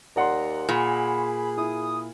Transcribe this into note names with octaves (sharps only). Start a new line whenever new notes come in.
D#2 D5 F#5 A#5 C6
A#2 G#4 B5
E4 D#6